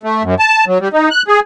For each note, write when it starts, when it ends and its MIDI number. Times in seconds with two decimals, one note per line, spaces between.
0.03 0.23 57
0.23 0.35 42
0.39 0.65 81
0.67 0.78 54
0.80 0.88 55
0.93 1.09 63
1.11 1.23 90
1.28 1.40 68